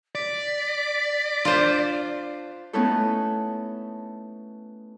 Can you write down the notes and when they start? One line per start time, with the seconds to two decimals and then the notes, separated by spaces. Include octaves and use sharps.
0.15 D5 B6
1.45 D4 F4 C5
2.73 A3 B3 C#4 D#4 E4 A4